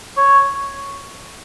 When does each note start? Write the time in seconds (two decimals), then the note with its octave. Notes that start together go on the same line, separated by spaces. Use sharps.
0.17 C#5